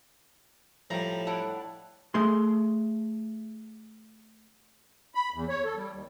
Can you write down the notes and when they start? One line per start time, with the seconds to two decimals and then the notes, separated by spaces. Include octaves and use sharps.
0.90 A2 F3 G3 A#5
1.27 D4 E4 F#5
2.14 A3 G#4 C6
5.15 B5
5.34 E2
5.49 C#5
5.64 A4
5.76 G3
5.93 D#2